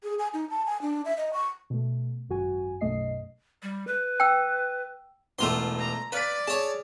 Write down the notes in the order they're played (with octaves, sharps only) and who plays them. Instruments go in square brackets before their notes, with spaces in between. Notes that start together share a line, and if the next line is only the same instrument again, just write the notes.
[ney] G#4
G#5
D#4
A5
G#5
D4
E5
D#5
C#6
[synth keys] B2 A3
G#1 F#2 F#4 G#5
B1 F#2 B2 A3 D#5 C7
[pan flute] G3
B4
[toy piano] G5 E6
[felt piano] E1 E2 [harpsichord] A3 F4 C6
[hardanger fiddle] A#5
[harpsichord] B4 [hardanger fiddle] D5 [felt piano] F5 F6 B6
[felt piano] G#4 [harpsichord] C#5 A5